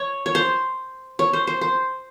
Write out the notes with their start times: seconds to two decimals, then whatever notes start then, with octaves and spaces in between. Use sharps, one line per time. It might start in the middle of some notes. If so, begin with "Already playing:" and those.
Already playing: C#5
0.26 C#5
0.35 C5
1.19 C#5
1.33 C5
1.47 C5
1.61 C5